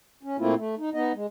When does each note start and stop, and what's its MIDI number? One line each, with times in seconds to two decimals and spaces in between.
0.23 0.37 61
0.39 0.54 46
0.39 0.54 57
0.39 0.54 58
0.39 0.54 60
0.39 0.54 64
0.39 0.54 65
0.57 0.75 57
0.78 0.90 63
0.94 1.12 59
0.94 1.12 63
0.94 1.12 75
1.14 1.26 56